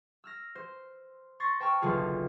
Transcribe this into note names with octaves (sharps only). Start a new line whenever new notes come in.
E6 F6 A#6
C5
C6 C#6 A6 A#6 C7
C5 G5 A5 C#6 F6
F#1 B1 D3 F4 G#4 F6